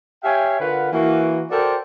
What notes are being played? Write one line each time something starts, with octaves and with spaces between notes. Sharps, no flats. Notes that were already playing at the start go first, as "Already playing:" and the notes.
G4 C#5 E5 F5 G5 G#5
D3 F4 A#4 B4 F#5
E3 A#3 F#4
F#4 A4 A#4 C5 D5 G5